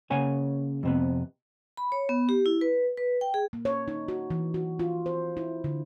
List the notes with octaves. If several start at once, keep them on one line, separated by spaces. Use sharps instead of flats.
C#3 A#3 C#5 F#5 G#5
F2 C3 B3
B5
C#5
B3
G4
E4
B4
B4
G5
G#4
A#3
C#5
D#4
F#4
E3
F#4
F4
C5
E4
D3